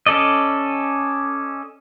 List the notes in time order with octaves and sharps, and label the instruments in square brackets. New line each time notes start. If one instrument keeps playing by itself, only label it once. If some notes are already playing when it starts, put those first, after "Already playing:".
[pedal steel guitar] C#4 A4 D5 D#5